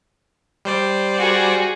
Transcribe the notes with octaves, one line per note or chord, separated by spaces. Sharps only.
G3 C5 D5
F#4 G#4